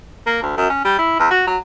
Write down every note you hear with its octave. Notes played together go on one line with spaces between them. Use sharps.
A#3
D2
F#2
C#4
G3
E4
E2
F#4
F#3